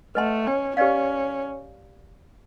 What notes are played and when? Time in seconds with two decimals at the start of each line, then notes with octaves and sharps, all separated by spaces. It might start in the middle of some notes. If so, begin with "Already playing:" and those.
0.15 A3 B4 D#5 F#5 A5 C6
0.47 C#4
0.77 C#4 G4 B4 D5 F5